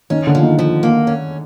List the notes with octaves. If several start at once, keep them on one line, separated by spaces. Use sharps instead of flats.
D#3 C#4
D3
F3
D#3
F3
A#3
C#4